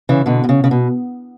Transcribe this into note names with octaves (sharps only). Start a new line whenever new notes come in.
C#3 E3
B2 D3
B2
C#3
C#3
B2